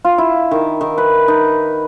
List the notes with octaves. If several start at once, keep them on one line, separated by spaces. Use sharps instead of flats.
F4
E4
D#3
D#3
B4
D#4